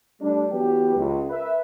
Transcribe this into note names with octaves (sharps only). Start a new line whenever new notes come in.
G3 A3 D4
E3 F#3 B3 G4
C#2
A#4 B4 E5